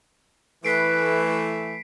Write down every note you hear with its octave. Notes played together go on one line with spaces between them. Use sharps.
E3 A3 B4 B6 C7 D7